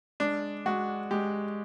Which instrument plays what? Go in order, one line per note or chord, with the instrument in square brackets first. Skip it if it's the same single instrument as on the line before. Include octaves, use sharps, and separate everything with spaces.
[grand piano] G#3 [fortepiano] D4
[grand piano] G#3 [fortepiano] F#4
[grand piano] G#3 [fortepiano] G4